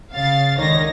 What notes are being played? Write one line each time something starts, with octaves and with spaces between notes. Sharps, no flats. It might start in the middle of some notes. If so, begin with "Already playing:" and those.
C#3 F5 A6
C#2 D3 D#3 D#4 C#5 A#6